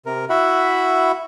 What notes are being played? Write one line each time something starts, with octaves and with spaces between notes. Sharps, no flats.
C3 A#4
E4 F#4 E5 F#5 B5